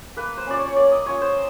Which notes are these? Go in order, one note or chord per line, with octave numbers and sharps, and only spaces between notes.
A#3 B4
C5
C#4 F4 D5
C#5
C#5
A#3 D5
D#5
C#4 F4 C#5
C5